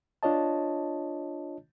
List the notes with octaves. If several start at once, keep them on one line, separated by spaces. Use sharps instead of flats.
D4 F4 C#5 D#5 A5